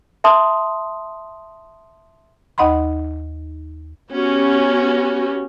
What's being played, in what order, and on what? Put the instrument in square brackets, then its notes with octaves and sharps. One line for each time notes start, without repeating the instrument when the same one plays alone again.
[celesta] E5 A5 C6 D#6
[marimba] D#2 D#4 D#5 F#5 B5 C6
[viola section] B3 C#4 F#4 G4